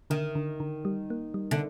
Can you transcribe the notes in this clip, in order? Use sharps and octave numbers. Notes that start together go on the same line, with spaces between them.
D3 D#3
D3
D3
G3
A#3
G3
D3